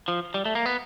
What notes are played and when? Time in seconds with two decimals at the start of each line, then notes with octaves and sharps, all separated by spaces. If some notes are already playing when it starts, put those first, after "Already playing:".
0.08 F3
0.34 G3
0.45 A3
0.55 A#3
0.66 B3